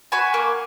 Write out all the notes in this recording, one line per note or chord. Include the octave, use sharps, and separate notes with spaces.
F#4 G#5 B5
A#3